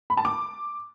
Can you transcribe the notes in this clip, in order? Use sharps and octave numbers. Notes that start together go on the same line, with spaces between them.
B5
A5
D6